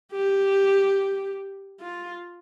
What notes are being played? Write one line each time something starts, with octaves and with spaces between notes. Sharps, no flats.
G4
F4